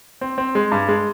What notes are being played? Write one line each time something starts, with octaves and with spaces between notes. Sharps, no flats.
C4
C4
G#3
G2
G#3